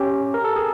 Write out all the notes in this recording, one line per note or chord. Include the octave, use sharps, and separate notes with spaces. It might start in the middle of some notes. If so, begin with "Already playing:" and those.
Already playing: C#4 G4
A#4
A4
G#4